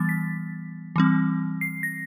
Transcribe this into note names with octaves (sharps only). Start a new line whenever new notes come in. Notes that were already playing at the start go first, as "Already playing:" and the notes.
Already playing: E3 G3 B3 A6
B6
E3 G3 C4
C7
A#6